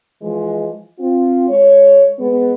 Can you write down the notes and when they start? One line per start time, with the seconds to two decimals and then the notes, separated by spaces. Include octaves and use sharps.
0.22 E3 F3 G#3
0.99 C4 F4
1.49 G#3 C#5
2.19 G#3 B3